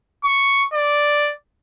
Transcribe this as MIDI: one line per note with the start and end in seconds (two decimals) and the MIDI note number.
0.24 0.63 85
0.74 1.32 74